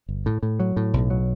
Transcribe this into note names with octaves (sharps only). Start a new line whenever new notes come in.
G1
A2
A2
F#3
A2
B1
F#3